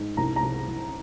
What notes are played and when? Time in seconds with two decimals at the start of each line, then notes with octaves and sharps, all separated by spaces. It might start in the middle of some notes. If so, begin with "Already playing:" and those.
Already playing: G#2
0.17 C2 A#5
0.36 A#5
0.42 C2
0.68 C2